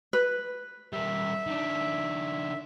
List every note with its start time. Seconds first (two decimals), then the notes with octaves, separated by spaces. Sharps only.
0.13 B4
0.93 G3 A#3 E5
1.46 D#3 D4